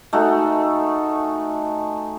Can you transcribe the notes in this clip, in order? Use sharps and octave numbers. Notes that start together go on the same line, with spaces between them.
A3 D#4 F#4 G#4